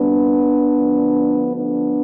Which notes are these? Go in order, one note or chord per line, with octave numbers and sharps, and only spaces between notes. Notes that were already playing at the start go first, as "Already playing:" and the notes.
Already playing: D2 C3 G3 B3 D4
D2 D3 F3
B3 D4